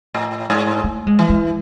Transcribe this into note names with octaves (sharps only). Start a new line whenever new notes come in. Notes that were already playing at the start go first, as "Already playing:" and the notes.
A2
G#2
A3
G#3
E3
G#3